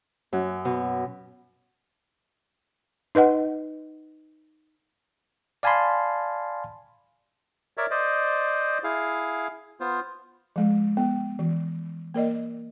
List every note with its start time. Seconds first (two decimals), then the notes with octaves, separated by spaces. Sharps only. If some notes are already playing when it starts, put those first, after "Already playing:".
0.33 F#2
0.65 B2
3.15 D#4 B4 D#5 F#5
5.63 D5 F5 G#5 A5 B5 C6
7.78 A#4 C#5 D5 E5
7.91 C5 D5 D#5
8.84 E4 G#4 F5
9.80 B3 F4 C5
10.56 F3 G#3
10.97 B3
11.39 E3
12.14 A#3 A#4 D5 D#5